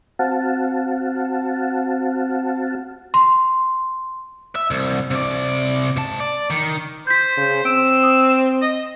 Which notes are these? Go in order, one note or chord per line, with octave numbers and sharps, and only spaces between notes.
C4 F#4 F5 F#5 A5
C6
E5
C2
C3 D5
G#2 A5
D5
D#3
C5 G6 B6
C#3
C4 E6 D7
D#6
D#5